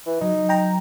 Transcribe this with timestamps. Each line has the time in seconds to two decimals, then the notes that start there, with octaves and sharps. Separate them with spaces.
0.06 E3
0.21 F#3 D#4
0.49 G5 A#5